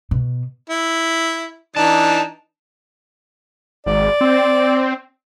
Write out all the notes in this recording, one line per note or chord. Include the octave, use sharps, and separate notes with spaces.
B2
E4
E3 D4 D#4 A5
G#1 D5
C4